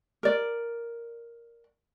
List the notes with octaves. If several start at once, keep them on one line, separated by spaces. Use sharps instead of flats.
A#4 D5